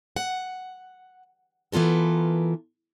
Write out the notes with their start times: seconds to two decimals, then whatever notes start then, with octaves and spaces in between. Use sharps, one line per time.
0.16 F#5
1.72 E3 B3 F4 A4 A#4